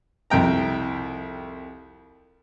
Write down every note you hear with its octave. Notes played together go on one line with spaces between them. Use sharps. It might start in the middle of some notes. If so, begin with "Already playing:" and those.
C2 F2 G5 A#5